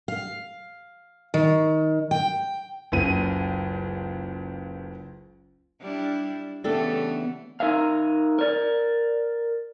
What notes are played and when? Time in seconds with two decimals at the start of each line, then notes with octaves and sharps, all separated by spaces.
0.08 F5
1.34 D#3
2.11 G5
2.92 F#1 C#2 D#7
5.81 G3 D4 E4
6.64 C#3 E3 A3 B3 D4 G4 A4
7.60 D#4 A#4 E5 F5
8.39 A#4 D5